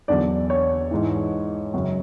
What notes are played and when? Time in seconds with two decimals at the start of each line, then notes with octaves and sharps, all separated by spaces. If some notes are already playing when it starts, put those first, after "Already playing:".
0.08 E2 D3 F#3 D5
0.50 C#5
0.91 G#2 E3
1.74 F#2 C#3 F#3